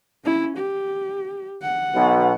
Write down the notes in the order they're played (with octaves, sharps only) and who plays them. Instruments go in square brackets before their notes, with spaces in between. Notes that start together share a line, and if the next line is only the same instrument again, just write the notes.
[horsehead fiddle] C#4 E4
G4
F#5
[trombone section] B1 B2